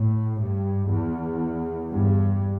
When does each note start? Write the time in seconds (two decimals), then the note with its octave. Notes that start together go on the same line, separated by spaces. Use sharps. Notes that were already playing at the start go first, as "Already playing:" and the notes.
Already playing: A2
0.41 G2
0.91 E2
1.92 G2